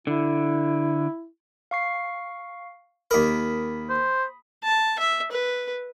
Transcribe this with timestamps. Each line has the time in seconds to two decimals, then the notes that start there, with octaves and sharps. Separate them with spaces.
0.07 D3 E4
1.71 F5 C#6 C7
3.11 D#2 A#4 B5 D#6 B6
3.90 C5
4.64 A5
4.99 E5
5.31 B4